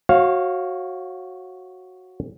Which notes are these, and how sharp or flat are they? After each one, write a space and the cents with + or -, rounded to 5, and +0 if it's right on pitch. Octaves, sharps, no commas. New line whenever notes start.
F#4 +0 C#5 -35 F5 +0